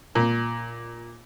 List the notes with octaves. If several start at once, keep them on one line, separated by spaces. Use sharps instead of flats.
A#2